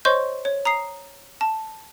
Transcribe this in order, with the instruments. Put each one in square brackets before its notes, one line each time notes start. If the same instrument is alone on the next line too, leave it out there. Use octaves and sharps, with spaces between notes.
[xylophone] C5 C#5 D#5 C6 C#6 G6
C#5
A#5 D#6 C7
A5